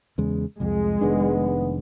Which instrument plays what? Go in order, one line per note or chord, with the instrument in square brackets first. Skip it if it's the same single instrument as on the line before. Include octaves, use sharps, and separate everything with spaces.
[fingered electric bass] E2 C#3 G#3
[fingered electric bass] C2 F2 [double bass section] G#3
[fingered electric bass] F1 D#3 D4 [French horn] B3